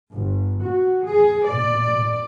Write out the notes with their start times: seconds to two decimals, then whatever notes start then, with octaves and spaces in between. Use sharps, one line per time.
0.11 G1
0.62 F#4
1.03 G#4
1.48 D5